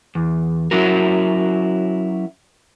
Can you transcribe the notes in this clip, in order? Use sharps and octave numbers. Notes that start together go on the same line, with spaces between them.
E2
F#3 C#4 E4 F#4 A#4